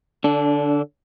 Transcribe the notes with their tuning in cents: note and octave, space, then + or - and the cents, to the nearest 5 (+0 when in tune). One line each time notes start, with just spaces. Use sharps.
D3 +0 D4 -25